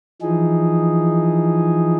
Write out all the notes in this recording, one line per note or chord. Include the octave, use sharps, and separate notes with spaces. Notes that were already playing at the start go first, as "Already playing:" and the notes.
E3 F3 D#4 G#4